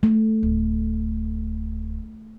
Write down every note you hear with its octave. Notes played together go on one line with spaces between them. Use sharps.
A3
D1